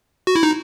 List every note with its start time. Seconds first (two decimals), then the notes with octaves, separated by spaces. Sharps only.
0.27 F#4
0.35 E4
0.43 D#4